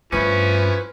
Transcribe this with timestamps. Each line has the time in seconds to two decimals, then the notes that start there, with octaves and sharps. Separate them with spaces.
0.12 G2 F3 A3 C#4 E4 B4